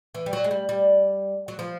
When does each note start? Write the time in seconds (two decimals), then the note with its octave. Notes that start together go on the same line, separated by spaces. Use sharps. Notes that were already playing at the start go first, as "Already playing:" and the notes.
0.15 E3
0.26 G3
0.33 F#3
0.44 G#3
0.51 G3
0.69 G3
1.48 F#3
1.59 F3